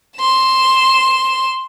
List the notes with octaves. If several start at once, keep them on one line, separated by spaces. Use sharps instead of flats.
C6 E7